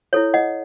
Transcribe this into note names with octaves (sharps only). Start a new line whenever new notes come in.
E4 A4 C#5
D#5 F#5